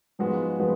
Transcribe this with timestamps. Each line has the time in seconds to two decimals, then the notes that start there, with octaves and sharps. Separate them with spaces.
0.19 G#2 F3 G#3 B3 F#4
0.59 F3 G#3 B3 F#4